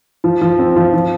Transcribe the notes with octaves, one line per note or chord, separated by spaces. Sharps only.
F3
F3
C4
F3
F3